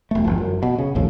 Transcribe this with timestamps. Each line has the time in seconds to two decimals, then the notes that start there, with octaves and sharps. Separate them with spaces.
0.11 E1 A3
0.25 G1 E2 F3
0.38 F#2
0.63 B2
0.78 C#3
0.95 G#1 D#2 A2 F3